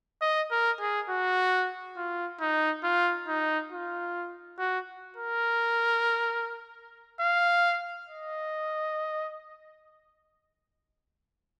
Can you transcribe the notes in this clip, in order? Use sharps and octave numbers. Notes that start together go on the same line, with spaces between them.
D#5
A#4
G#4
F#4
F4
D#4
F4
D#4
F4
F#4
A#4
F5
D#5